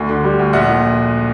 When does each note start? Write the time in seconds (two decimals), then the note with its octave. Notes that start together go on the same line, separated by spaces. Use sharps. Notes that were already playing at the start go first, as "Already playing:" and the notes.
Already playing: D2
0.09 D3
0.24 G3
0.39 D2
0.53 A#1 F#5
0.68 A#2